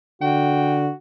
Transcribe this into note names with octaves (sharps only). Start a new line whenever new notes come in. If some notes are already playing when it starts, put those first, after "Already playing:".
D3 F#4 G5